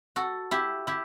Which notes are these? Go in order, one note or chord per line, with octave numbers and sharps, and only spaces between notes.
F#4 A4
E4 G4
E4 G4